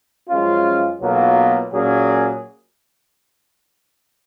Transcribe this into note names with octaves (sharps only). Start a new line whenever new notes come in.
F#2 F3 G#3 C#4 F4
B1 B2 F#3 A#3 F4
A#2 F#3 A#3 C#4 G#4